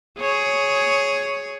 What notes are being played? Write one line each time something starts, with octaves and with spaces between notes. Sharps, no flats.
G#4 C#5